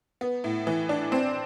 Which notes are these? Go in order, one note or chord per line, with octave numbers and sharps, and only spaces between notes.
B3
A2
E3
D4
C4